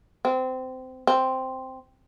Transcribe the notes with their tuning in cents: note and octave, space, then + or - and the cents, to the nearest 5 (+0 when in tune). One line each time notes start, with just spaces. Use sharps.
C4 -20
C4 +0